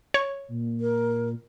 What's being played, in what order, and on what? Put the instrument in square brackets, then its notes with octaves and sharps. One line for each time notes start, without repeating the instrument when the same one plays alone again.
[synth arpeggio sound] C#5
[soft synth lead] A#2
[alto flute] A#4